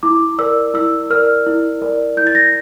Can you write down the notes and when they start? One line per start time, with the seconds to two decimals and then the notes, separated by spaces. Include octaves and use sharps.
0.03 E4 D6
0.39 A#4 D5 E6
0.74 E4 E6
1.10 A#4 D5 F6
1.46 E4
1.82 A#4 D5
2.17 E4 G6
2.27 A6
2.35 A#6